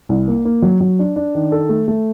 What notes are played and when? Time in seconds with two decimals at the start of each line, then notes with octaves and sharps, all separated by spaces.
0.09 C2
0.28 A#3
0.45 A#3
0.62 F#3
0.81 F#3
0.99 D4
1.16 D4
1.35 D#3
1.52 A4
1.69 A3
1.88 A3